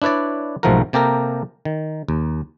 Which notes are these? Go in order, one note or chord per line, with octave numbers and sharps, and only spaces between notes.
D4 E4 B4 C#5 D5
B1 G#2 F3 A3 F#4 A#4
C3 A#3 G4 A4 A#4
D#3
D#2